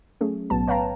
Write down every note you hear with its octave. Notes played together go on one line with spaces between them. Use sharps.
F#3 A3 C#4 G#4
B1 A2 F#3 B3 A5
B4 C#5 F5 G5 A5 A#5